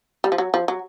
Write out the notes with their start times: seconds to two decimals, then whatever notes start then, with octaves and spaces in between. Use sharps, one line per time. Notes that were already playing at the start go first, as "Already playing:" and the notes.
0.24 G3
0.32 F3
0.38 F#3
0.54 F3
0.68 F#3